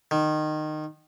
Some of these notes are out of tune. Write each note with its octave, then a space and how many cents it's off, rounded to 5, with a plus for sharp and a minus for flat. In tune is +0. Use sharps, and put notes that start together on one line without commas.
D#3 -20